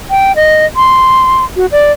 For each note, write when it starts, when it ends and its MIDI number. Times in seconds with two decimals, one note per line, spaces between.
0.10 0.35 79
0.36 0.66 75
0.76 1.45 84
1.56 1.66 66
1.72 1.92 74